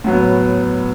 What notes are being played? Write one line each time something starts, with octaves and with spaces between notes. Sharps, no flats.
A2 F#3 B3